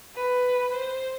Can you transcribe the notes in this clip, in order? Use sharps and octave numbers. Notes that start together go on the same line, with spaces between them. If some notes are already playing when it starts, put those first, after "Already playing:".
B4
C5